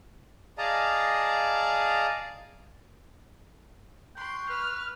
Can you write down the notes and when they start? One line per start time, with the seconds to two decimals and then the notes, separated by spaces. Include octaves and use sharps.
0.58 G#4 D5 D#5 F5 A5 A#5
4.17 G5 C6 C#6 F#6
4.49 B4 F6